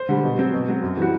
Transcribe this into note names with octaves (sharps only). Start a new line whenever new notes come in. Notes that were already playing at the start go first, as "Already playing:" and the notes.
Already playing: C5
D3 G3
B2
F#3 C4
B2
F#3 C4
F#2
E3 G3 F#4